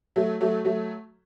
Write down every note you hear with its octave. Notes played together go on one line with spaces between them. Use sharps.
F#3 A3
F#3 A3
F#3 A3